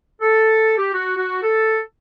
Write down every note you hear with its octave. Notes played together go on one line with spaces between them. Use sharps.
A4
G4
F#4
F#4
A4